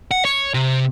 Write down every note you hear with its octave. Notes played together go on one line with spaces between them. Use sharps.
F#5
C#5
C3